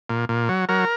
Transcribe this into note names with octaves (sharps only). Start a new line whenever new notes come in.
A#2
A#2
F#3
F#3 A#4